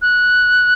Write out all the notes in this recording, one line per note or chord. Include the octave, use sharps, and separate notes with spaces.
F#6